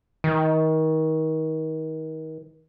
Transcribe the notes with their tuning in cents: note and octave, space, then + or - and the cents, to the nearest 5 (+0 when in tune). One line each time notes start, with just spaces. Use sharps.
D#3 +30